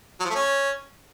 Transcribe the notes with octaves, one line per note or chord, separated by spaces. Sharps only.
F#3
F3
A3
C#4